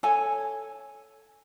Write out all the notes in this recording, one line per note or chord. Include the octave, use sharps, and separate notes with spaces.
A4 C#5 G#5